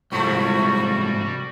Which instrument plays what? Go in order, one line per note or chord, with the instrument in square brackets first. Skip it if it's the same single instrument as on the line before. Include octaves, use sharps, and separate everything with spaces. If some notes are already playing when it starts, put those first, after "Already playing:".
[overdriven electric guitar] C2 G#2 [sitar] F3 A3 E4 [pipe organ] G3 F#4 [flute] C#6